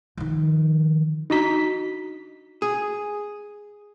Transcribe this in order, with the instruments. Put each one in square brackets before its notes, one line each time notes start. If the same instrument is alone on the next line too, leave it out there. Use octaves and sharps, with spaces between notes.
[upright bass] D#3 F3
[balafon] D4 F#4 A#5 [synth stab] D#4 D#5 B6
[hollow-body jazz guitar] G#4